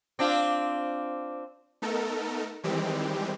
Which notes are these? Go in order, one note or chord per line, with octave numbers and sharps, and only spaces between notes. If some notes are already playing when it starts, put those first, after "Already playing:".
C4 D4 F4
A3 B3 D#4 A4 A#4
D#3 E3 G3 G#3 C4 G4